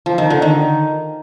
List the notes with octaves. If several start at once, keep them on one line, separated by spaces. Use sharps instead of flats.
F3
D#3
D3
D#3